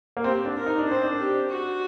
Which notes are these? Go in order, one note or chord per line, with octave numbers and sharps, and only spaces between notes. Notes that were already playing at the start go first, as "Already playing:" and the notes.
A#3
C4 G4
D4
A#4
D#4
D4
C4 C5
D4
G4
F#4